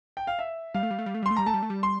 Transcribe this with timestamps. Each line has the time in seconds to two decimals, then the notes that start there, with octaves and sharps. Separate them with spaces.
0.17 G5
0.27 F5
0.39 E5
0.74 G3 F5
0.83 A3
0.91 G3
0.99 A3
1.06 G3
1.15 A3
1.23 G3
1.26 A3 C6
1.36 G3 A#5
1.46 A3 A5
1.54 G3
1.63 A3
1.70 G3
1.83 C6